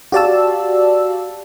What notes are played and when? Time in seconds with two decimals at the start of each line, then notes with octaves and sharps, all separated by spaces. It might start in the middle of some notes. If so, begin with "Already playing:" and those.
0.12 F#4 G4 D5 F5 A5 E6